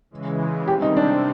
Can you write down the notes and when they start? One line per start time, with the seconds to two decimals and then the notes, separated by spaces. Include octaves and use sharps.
0.11 C#3 E3 G#3
0.67 C3 D#3 G3 C4 G4
0.82 D#4
0.97 D4